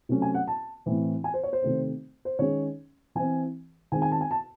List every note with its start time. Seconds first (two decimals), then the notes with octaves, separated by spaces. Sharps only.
0.09 C3 F#3 A3 C#4
0.22 G#5
0.34 F#5
0.47 A5
0.86 A2 E3 C4
1.24 G#5
1.34 C5
1.43 C#5
1.53 C5
1.62 C3 D#3 A3 C4
2.25 C5
2.39 D#3 G#3 C#4 C#5
3.15 E3 C4 G#5
3.92 D#3 G#3 C4 G#5
4.02 G#5
4.11 A5
4.21 G#5
4.31 A5